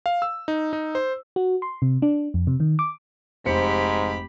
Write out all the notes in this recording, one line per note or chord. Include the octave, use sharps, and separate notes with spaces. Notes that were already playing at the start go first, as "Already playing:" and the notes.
F5
E6
D#4
D#4
C5
F#4
C6
C3
D4
F2
C3
D#3
D6
F1 G#2 G4 C5 B5 C#7